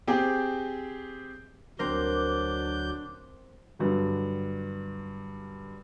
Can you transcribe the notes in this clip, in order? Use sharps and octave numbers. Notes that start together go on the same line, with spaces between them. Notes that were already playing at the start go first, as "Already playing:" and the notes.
C4 G4 G#4
D2 F#3 C4 D4 A#4 D6 G6
G2 D3 F#3